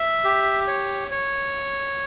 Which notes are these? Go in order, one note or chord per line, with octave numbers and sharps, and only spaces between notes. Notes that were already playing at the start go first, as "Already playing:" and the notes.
Already playing: E5
G4
C#5
C#5